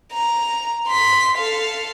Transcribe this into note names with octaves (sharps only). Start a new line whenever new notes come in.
A#5
C6 B6
A4 F5